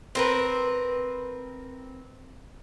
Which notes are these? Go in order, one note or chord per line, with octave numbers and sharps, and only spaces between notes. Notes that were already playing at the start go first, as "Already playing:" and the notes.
C4 A#4 B4